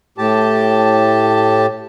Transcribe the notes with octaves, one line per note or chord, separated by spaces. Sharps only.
A2 G4 A5